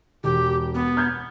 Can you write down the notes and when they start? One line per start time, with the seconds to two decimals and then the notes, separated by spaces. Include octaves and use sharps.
0.24 E1 G4
0.75 B3
0.97 F6 G6 G#6